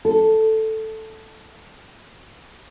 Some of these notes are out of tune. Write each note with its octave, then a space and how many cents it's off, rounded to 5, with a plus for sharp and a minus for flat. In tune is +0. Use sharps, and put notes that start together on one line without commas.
A4 +0